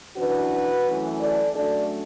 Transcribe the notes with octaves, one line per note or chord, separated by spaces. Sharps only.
F#2 E3 D4 F#4 B4
F#2 E3 A3
A4 D5
F#2 F#3 A3 D4 A4 D5